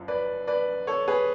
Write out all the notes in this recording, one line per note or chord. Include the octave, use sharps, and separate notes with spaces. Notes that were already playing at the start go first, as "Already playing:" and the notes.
Already playing: F#1 F#2 F3
B4 D5
B4 D5
A4 C#5
G#4 B4